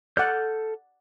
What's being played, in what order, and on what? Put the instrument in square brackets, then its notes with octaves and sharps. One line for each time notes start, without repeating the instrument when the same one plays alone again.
[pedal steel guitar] A4 F6 G6 [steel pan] D5 F#5